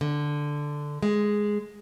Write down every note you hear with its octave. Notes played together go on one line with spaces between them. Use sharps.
D3
G#3